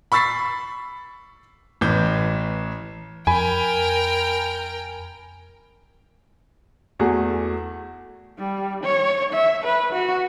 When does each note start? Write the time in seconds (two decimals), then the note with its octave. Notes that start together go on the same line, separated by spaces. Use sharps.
0.12 B5 C#6 E6 A6 B6 C7
1.81 A1 E3 G6
3.27 F2 A#4 G5 G#5 B5
6.99 E2 A3 F#4 G#4
8.38 G3
8.84 C#5
9.33 E5
9.64 B4
9.93 F#4